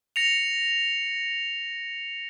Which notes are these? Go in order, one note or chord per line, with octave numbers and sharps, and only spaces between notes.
A#6 C#7 F7